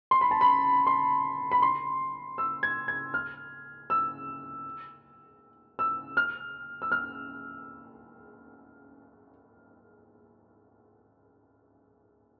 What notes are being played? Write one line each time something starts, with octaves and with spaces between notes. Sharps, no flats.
C6
B5
A5
B5
C6
B5
C6
E6
G#6
G#6
F6
E6
E6
F6
E6
F6